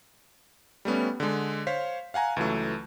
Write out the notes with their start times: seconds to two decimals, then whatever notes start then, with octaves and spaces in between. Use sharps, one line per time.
0.85 G3 A3 B3 C#4
1.20 D3 G#3
1.67 C5 C#5 F5 B6
2.14 F5 F#5 G#5 A#5
2.36 C#2 E3 F#3 A3